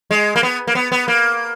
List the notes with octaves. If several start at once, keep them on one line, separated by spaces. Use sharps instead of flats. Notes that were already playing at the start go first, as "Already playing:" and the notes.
G#3
A#3
B3
A#3
B3
B3
A#3